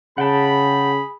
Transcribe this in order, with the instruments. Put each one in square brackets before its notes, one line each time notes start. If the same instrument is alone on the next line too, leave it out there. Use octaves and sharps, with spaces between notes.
[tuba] C#3 [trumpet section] G#4 B5 [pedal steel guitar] F#5 G5 A5